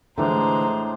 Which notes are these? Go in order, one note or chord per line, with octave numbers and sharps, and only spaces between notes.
A2 D3 E3 F3 G#3 D4 C5 A#5